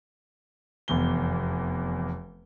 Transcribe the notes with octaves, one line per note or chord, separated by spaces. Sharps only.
F1 E2 G7